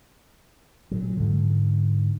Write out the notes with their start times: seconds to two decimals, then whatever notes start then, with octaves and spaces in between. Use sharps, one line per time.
0.91 A#2 F#3
1.17 G#2 D3